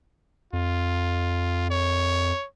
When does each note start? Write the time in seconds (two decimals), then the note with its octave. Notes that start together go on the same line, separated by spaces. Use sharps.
0.53 F2 F4
1.70 C#5